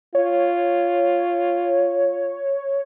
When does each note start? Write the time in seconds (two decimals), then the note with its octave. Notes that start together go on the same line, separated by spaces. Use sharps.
0.15 F4 C#5